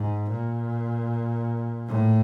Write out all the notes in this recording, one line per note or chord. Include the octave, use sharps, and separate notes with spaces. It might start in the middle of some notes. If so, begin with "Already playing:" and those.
Already playing: G#2
A#2
A2